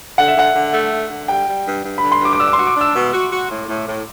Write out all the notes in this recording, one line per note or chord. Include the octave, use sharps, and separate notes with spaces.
D3 F#5
E5
D3 F#5
D3
A3
D3
D3
G3 G5
G3
G2
G2
D3 B5
C6
G2 D6
D6
D4 E6
D6
F#4 C6
D6
D4
E6
B2
F#4
F#4
A2
A2
A2